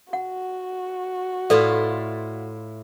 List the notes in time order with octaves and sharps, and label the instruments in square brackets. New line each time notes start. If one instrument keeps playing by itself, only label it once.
[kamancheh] F#4 [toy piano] F#5
[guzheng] A2 E4 F4 [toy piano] A4 B4 D5